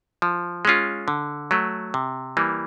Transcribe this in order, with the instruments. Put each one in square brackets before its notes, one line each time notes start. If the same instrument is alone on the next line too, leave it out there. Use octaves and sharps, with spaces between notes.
[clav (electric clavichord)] F3
G#3 C#4 F4
D3
F#3 A3
C3
E3 G3 A#3